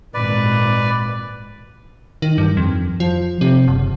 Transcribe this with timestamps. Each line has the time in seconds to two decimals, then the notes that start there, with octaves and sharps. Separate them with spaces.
0.14 G#1 A#2 B4 D5
2.22 D#3
2.38 G2
2.57 F2
3.00 F3
3.41 C3
3.68 F#1